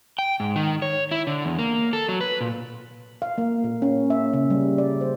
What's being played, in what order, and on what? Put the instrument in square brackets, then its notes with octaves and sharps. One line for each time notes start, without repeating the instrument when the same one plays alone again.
[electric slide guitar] G5
G#2
D#3
C#5
E4
D3
E2
A#3
A4
F#3
B4
A#2
[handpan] F5
A#3
A#2
C#4
E5
C#3
G3
D5
C5